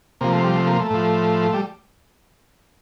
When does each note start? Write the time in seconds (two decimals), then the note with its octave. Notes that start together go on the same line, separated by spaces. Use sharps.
0.21 C3 F3 A#3
0.33 A3
0.44 G3
0.56 A3
0.67 A#3
0.80 A3
0.90 A2 F3
1.54 G3